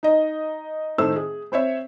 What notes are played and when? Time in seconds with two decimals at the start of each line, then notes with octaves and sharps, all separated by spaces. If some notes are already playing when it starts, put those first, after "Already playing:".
0.03 D#4 D#5
0.98 A2 D#3 A3 C5 E6
1.16 G#4
1.52 C4 C5 C#5 E5